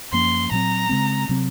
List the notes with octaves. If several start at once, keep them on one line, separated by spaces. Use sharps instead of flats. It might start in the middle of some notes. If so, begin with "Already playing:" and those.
F#2 F3 A#3 C#4 C6
A#2 F#3 C4 A#5
C#3 G#3 C4
C3 F#3 C4